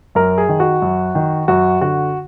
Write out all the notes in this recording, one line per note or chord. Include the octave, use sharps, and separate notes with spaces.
F#2 A#4
G#4
D#3
F#4
F#2
D#3
F#2 F#4
D3 F#4